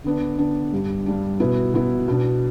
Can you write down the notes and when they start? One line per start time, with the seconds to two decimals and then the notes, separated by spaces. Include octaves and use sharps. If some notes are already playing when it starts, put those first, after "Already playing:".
0.04 D3 B3 D4
0.38 D3 B3 D4
0.73 G2 G3 D4
1.06 G2 G3 D4
1.40 B2 B3 E4
1.74 B2 B3 E4
2.08 B2 B3 D4